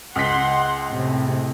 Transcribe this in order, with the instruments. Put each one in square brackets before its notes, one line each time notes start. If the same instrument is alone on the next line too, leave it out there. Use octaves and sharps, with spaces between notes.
[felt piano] C#2 B6 [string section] F#5 C6
[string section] A2 C3